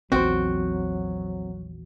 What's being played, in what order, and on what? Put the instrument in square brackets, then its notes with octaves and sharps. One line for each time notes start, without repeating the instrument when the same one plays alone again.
[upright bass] A#1 E2 [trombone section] F#3 [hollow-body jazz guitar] C4 C5 [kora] F#4 G5